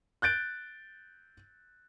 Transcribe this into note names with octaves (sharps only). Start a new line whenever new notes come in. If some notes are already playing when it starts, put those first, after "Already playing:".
F#6 G6 A6 D7